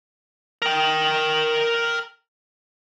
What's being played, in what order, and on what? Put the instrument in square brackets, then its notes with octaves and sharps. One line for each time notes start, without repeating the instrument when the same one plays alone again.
[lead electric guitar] A#4 G5